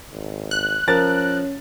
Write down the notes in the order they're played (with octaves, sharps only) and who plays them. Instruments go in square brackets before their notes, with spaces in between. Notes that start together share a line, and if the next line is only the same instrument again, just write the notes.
[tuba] G#1
[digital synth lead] F#6
[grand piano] F3 A#4 A6 [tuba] C#4